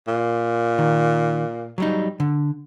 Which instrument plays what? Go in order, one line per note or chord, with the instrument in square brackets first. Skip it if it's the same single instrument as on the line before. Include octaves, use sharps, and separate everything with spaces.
[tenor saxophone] A#2
[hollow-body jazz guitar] D#3
F#3 G3 D#4
D3